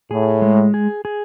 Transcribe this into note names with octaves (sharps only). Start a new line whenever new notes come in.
A2 G#4
G#3
G#4
G#4